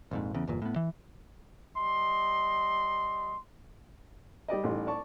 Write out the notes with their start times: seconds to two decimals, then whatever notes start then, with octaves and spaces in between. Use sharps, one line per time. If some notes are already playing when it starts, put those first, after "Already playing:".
0.11 A#1 F2 G#2
0.34 E2 C#3
0.47 G1 E2 A#2
0.62 A2 B3
0.76 E3
1.77 G3 D#5 C6
4.48 G3 G4 D5 D#5
4.64 A1 G3 D#4 C6
4.87 D5 A5 C#6